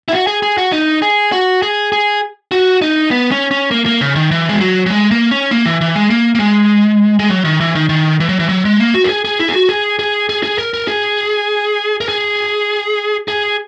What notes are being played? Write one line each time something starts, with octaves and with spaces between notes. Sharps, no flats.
E4
F#4
G#4
G#4
F#4
D#4
G#4
F#4
G#4
G#4
F#4
D#4
B3
C#4
C#4
A#3
A#3
C#3
D#3
E3
G#3
F#3
F#3
G#3
A#3
C#4
A#3
E3
E3
G#3
A#3
A#3
G#3
G#3
F#3
D#3
E3
D#3
D#3
E3
F#3
E3
F#3
G#3
A#3
F#4
A#4
G#4
G#4
E4
G#4
F#4
G#4
G#4
G#4
G#4
A#4
A#4
G#4
A#4
G#4
G#4